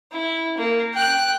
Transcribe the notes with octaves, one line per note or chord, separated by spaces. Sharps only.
E4
A#3
G5 F#6